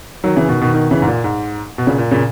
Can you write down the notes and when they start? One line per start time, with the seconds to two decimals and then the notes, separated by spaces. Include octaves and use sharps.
0.24 D#3 F#3
0.36 C#3 E3
0.49 B2 D#3
0.61 B2 D#3
0.74 B2 D#3
0.91 C#3 E3
1.02 G#2
1.07 A#2
1.24 G#2
1.78 B2
1.86 A#2 C#3
1.98 A#2
2.11 A#2 C#3